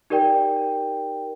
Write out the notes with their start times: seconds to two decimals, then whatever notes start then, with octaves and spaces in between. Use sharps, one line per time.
0.10 D#4 G4 A#4 D5 G5